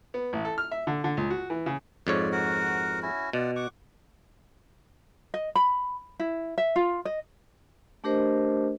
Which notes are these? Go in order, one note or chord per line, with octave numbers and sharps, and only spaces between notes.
B3
A1
A4
F6
E5
D3
D3
C#2
F#4
E3
C#3
F2 G#2 F4 C#5 D5
F#4 A#4 F#5
C#4 E4 F#4
B2 F4 D5 F#5
F#5 C#6 D6
D#5
B5
E4
E5
F4
D#5
A3 D4 G4 A#4 C5 D#5